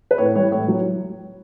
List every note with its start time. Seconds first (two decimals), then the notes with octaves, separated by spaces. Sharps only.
0.11 B4
0.18 A2 C#5
0.35 E3 G3 C#5
0.51 A2 C#5
0.68 F#3